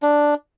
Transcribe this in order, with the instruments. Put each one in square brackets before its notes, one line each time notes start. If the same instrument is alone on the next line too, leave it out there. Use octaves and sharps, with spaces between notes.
[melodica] D4